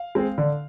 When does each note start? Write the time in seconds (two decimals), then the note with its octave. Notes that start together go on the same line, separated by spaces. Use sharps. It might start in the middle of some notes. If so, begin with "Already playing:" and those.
Already playing: F5
0.15 G#3 C4
0.38 D3